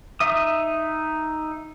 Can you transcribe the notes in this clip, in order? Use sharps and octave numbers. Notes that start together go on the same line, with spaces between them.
D#4 E5 D#6